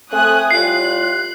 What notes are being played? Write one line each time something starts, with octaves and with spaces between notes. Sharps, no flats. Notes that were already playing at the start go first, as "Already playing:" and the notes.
A3 C4 G#5 D#6 F#6
A2 G3 F4 F#6 C7